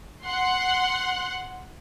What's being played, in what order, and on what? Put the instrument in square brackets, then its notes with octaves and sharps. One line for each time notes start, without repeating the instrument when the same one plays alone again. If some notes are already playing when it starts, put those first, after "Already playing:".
[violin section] F#5 C6